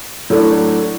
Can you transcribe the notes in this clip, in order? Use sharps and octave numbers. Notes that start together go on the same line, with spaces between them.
A2 F#3 A3 D4